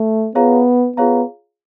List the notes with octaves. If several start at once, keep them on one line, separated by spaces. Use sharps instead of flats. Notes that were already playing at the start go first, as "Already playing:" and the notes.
Already playing: A3
B3 F4 G#4 C#5 F5 A#5
B3 F4 G#4 C#5 F5 A#5